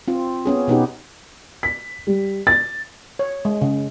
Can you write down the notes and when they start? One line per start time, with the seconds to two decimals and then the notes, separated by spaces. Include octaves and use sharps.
0.08 C4 F4
0.45 B3 C#4 G#4
0.68 B2 B3 D#4 G4
1.63 B6
2.07 G3
2.47 A6
3.19 C#5
3.45 G#3
3.61 C#3